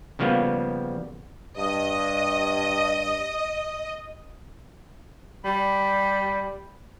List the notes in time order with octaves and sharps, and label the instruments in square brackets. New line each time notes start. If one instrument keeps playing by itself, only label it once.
[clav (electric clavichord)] C#3 F3 G3 A#3 B3
[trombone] G2 [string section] D#5
[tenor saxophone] G3 [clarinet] B5